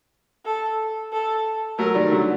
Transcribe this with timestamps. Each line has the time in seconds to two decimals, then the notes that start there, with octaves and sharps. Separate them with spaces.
0.45 A4
1.12 A4
1.78 F#3 A3 A#4
1.95 D#3 G3
2.12 D3 F#3